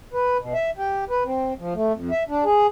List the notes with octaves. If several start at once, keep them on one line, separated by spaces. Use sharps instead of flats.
B4
B2
E5
G4
B4
C4
F3
A3
F2
E5
D4
G#4